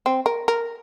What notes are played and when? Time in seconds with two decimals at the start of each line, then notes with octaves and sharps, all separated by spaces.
0.06 C4
0.26 A#4
0.48 A#4